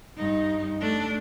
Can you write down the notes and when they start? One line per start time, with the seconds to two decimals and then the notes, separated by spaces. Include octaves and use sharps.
0.17 G2 D#4
0.81 A3 D4